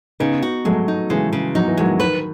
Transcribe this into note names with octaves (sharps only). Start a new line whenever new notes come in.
C#3 B3 D#4
F#4
F#3 G#3 A3
D#4
C#3 E3 G#3
C#3
F#3 D#4
E3
D#3 F#3 G#3
D#3 B4